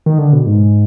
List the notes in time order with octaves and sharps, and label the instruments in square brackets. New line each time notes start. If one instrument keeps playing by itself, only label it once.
[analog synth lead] D#3
D3
B2
G#2